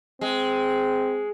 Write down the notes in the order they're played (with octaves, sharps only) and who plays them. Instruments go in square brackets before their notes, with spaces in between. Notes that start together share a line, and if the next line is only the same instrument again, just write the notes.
[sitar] G#3 [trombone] C4